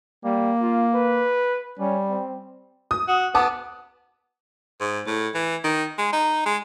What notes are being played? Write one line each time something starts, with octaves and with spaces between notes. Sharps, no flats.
G3 A#3
F4
B4
G3 C#4
C4
D#6
F#4
B3 A5 D6 D#6
G#2
A2
E3
D#3
G#3
D#4
G#3